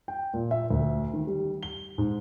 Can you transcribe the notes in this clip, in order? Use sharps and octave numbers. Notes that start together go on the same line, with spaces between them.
G5
A#2
E5
D2
D#3
G3
G7
G#2